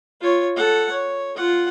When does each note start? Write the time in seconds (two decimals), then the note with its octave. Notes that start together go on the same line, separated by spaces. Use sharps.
0.21 F4 C#5
0.56 A4 F#5
0.91 C#5
1.36 F4 F#5